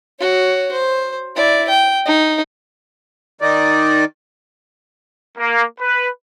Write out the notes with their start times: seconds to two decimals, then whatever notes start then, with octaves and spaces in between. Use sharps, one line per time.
0.19 F#4 C#5
0.72 C5
1.36 E4 D5
1.69 G5
2.06 D#4
3.41 D#3 D#4 D5
5.38 A#3
5.80 B4